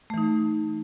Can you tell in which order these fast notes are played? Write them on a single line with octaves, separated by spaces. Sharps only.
A3 E3 D#4